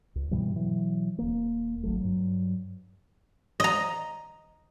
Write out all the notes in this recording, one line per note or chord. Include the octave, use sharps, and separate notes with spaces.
C#2
G2 B2 E3 G3
B2 E3 F#3
D#1 A#3
G#1 F#3 A3
G2 F#3
D#5 A#5